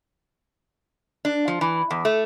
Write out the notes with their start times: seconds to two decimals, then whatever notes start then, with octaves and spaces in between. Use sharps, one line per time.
1.25 D4
1.48 F3
1.61 E3
1.91 E2
2.05 A3